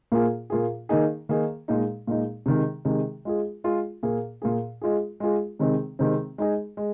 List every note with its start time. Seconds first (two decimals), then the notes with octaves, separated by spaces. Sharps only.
0.12 A#2 A#3 F4 G#4
0.50 A#2 A#3 F4 G#4
0.89 D#3 A#3 D#4 G#4
1.29 D#3 A#3 D#4 G#4
1.68 A#2 G#3 D#4
2.07 A#2 G#3 D#4
2.46 C3 D#3 G#3
2.85 C3 D#3 G#3
3.25 G#3 F4 G#4
3.64 G#3 F4 G#4
4.03 A#2 A#3 G#4
4.42 A#2 A#3 G#4
4.82 G#3 F4 G#4
5.20 G#3 F4 G#4
5.59 C3 D#3 G#3 C4
5.99 C3 D#3 G#3 C4
6.38 G#3 D#4 G#4
6.77 G#3